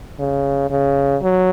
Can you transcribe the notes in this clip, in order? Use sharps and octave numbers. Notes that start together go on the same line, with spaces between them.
C#3
C#3
F#3